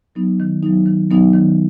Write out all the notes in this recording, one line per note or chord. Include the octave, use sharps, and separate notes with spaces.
F#3 B3 D#4
D#3
F#3 B3 D#4
D#3
F#3 B3 D#4
D#3